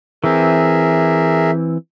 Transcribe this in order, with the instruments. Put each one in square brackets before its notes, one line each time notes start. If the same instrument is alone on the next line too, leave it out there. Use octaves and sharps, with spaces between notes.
[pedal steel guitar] E3 C4 [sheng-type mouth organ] G#4 A#4 E5